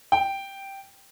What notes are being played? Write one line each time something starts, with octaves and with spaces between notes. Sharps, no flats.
G5